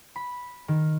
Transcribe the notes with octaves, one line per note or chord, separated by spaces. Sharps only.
B5
D#3